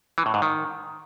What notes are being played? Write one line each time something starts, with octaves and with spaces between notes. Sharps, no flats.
E3
A2
G#2
D#3